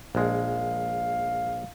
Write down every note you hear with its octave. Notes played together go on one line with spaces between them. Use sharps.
A#1 G#3 F5